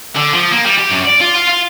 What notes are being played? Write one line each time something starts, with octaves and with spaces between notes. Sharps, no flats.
D3
F3
A#3
G3
G4
F#2
D5
F4
F4
F4